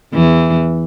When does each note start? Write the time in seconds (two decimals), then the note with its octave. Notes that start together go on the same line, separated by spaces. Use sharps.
0.13 E2 E3